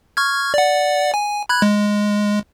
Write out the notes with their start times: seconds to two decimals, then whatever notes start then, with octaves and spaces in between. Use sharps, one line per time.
0.17 C#6 F6 G#6
0.54 D5 F#5
1.14 G#5
1.49 B5 F#6 G#6
1.62 G#3